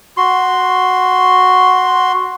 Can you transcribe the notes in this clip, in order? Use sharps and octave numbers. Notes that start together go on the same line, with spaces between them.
F#4 C6